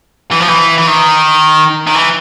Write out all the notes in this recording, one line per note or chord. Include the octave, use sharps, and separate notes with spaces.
E3
F3
E3
E3
D#3
D#3
E3